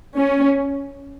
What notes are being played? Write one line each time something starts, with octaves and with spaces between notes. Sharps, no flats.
C#4